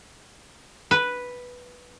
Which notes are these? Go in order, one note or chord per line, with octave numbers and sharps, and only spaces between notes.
B4